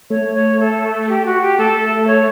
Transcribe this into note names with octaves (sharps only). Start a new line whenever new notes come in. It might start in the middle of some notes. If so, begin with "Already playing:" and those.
A3 C#5
C#5
A4
G4
F#4
G4
A3 A4
C#5